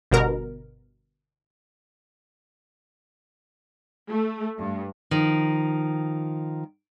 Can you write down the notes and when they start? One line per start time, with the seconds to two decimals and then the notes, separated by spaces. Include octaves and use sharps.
0.11 G1 B2 A#4
4.09 A3
4.58 G2
5.11 D#3 F3